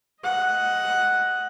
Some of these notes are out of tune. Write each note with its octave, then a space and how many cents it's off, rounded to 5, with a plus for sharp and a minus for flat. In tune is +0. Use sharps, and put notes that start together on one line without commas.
D#5 +15 F#5 +0